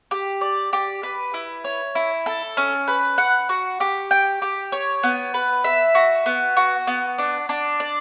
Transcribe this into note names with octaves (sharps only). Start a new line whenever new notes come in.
G4
D5
G4
B4
E4
C#5
E4
A4
C#4
B4
F#5
F#4
G4
G5
G4
C#5
B3
B4
E5
F#4
B3
F#4
B3
D4
D4
D5